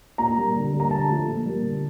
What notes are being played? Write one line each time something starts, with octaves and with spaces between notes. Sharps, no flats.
A#2 A#5
G3 A#3
D3
G3 A#3
A#5
D3 A5
F3 A3
A#2
G3 A#3
D3